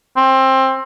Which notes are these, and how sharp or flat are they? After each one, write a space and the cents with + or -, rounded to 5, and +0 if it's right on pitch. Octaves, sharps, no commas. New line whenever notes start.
C4 +20